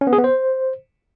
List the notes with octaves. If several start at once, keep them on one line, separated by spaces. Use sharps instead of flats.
C#4
B3
G#4
B3
C5